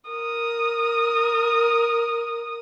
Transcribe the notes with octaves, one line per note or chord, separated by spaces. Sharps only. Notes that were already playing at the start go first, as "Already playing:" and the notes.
A#4 D#6